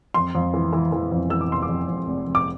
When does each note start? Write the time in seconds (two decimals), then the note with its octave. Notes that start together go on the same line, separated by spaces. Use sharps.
0.14 F2 C6
0.35 F2
0.54 E3
0.73 E3
0.92 E3
1.12 F2
1.30 E3 E6
1.41 D6
1.50 F1 C6
1.62 D6
1.69 F2
1.88 F2
2.07 F1
2.26 F1
2.35 D6